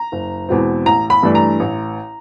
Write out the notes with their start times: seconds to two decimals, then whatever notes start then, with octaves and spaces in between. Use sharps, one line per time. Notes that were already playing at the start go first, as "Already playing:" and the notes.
Already playing: A#5
0.12 F#1
0.49 E2 B2 G#3 C4
0.85 A1 A#5
1.10 B5
1.23 G2 E3 A3 D4
1.35 A#5
1.60 A1